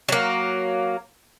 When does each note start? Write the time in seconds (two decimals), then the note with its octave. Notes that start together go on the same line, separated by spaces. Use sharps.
0.09 F#3 A#3